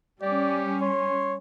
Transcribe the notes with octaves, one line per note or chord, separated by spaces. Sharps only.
G3 C#4 G4 D5
C#5 C6